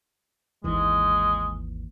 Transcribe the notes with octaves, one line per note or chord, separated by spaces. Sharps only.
G#1 D#2 E3 G#3